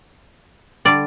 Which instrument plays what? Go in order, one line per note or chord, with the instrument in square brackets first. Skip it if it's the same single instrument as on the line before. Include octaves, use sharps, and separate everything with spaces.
[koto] D3 G3 D5